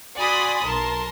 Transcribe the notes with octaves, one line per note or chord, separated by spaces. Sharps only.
F#4 D5 G#5 B5 C6 D#6
B1 A#4 A5 C6